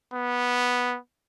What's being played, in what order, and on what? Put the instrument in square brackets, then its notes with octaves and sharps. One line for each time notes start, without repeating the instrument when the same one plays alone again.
[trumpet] B3